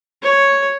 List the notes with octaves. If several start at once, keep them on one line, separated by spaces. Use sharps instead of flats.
C#5